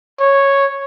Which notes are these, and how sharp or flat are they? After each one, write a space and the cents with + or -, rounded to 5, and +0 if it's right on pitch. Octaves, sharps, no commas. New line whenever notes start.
C#5 -5